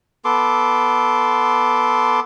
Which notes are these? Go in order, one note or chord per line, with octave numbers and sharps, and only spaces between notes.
B3 A4 C6 D6